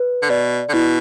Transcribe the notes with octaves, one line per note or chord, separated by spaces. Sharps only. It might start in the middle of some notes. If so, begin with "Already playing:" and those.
Already playing: B4
D3
B2 D5
D3
B2 E4